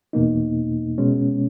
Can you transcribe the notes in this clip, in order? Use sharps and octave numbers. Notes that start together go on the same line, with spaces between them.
E2 B2 A#3 D#4
B2 G#3 C#4